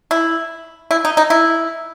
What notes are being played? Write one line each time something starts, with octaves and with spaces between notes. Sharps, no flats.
E4
E4
D#4
D#4
E4